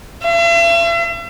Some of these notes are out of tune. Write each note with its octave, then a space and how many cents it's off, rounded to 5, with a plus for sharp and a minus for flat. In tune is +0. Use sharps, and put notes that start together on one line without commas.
E5 +45